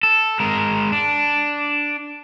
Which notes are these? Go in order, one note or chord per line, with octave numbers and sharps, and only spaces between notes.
A4
G#3 A#4
D4